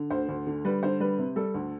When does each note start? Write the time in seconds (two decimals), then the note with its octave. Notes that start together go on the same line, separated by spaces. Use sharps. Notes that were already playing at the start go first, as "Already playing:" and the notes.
Already playing: D3
0.10 D2 C5
0.29 D2
0.47 D3
0.65 G3 B4
0.83 D3 C5
1.00 G3 B4
1.18 C3
1.36 G3 A4
1.54 D2